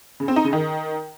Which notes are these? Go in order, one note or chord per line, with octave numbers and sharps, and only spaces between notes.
C#3
C4
D#4
C#3
D#3